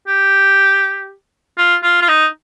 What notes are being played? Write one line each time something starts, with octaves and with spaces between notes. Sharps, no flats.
G4
F4
F4
F4
D#4